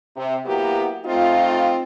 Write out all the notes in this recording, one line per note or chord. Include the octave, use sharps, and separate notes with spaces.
C3
F#3 A#3 B3 E4 F#4 G4
A3 C4 D#4 F4